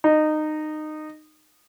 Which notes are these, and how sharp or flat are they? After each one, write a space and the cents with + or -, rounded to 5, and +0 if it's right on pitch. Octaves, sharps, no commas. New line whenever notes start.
D#4 -20